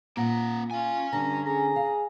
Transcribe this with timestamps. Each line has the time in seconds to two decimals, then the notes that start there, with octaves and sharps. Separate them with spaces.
0.17 A#2 A#3 F#5 A#5
0.71 C#4 F4 G#5
1.13 G2 D3 A#5
1.46 G#4 A#5
1.76 F5